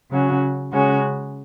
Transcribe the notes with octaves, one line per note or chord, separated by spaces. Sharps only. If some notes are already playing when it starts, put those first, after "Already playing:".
C#3 F#3 C#4 F#4
C#3 G#3 C#4 F#4